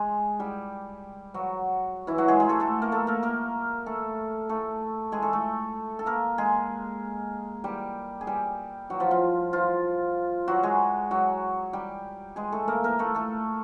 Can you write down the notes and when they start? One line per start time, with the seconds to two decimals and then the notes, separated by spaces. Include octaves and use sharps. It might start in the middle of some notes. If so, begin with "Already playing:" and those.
Already playing: G#3 G#4
0.40 G3 G4
1.34 F#3 F#4
2.07 E3 E4
2.18 F#3 F#4
2.28 G#3 G#4
2.40 G#3 G#4
2.49 A3 A4
2.60 A3 A4
2.82 A#3 A#4
2.92 A3 A4
3.07 A#3 A#4
3.23 A#3 A#4
3.86 A3 A4
4.49 A3 A4
5.12 G#3 G#4
5.22 A3 A4
5.33 A3 A4
5.99 A4
6.06 A#3 A#4
6.38 G#3 G#4
7.64 G3 G4
8.21 G#4
8.27 G3 G4
8.90 F#3 F#4
9.00 F3 F4
9.11 F3 F4
9.53 F3 F4
10.48 F#3 F#4
10.63 G#3 G#4
11.11 F#3 F#4
11.73 G3 G4
12.36 G#3 G#4
12.52 A3 A4
12.68 A#3 A#4
12.84 A#3 A#4
12.99 A3 A4
13.15 A3 A4